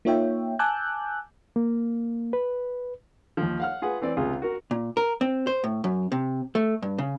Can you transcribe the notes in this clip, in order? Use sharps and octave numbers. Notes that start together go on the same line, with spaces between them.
A#3 D#4 F4 C#5 E5 G5
G#5 A5 D6 E6 F#6 G6
A#3
B4
D#2 F3
F5 F#5 F6
F4 G#4 B4 F#5
E3 C4 D5
C#2 C3 F4 G#4
F#4 A#4
A#2
A#4
C4
C5
A2
F#2
C3
A3
G2
C#3